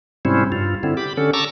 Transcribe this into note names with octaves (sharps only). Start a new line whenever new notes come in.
G#2 C3 G3 C4 C#4 E4
G2 F4
D3 C4 E4
G4 B5 D6
D3 C#4 A4
A5 A#5 C#6 D6 E6